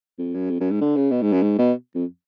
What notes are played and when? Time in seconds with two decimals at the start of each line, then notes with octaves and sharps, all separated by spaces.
0.18 F2
0.34 F#2
0.50 F2
0.60 F#2
0.71 G#2
0.81 D3
0.96 C#3
1.11 B2
1.22 G#2
1.32 F#2
1.42 G#2
1.58 B2
1.95 F2